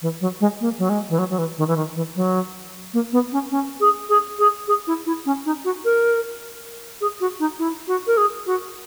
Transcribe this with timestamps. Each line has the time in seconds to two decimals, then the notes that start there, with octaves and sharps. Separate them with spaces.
0.02 E3
0.21 F#3
0.40 G#3
0.61 A#3
0.79 F#3
0.89 G#3
1.10 E3
1.19 F#3
1.30 F#3
1.38 E3
1.58 D#3
1.68 E3
1.77 D#3
1.96 E3
2.16 F#3
2.94 A#3
3.13 B3
3.32 C#4
3.51 C#4
3.80 G#4
4.09 G#4
4.39 G#4
4.68 G#4
4.87 E4
5.06 E4
5.26 C#4
5.45 D#4
5.65 F#4
5.85 A#4
7.01 G#4
7.21 F#4
7.40 D#4
7.59 E4
7.88 F#4
8.07 A#4
8.17 G#4
8.46 F#4